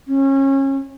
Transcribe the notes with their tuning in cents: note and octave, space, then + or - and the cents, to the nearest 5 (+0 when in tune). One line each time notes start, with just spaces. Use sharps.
C#4 -25